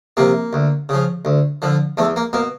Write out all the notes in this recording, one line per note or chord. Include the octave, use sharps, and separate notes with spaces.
C3 F3 A#3
D2
C#3 F3
D2
D3 F3
E2 A3
A#3
B2 A#3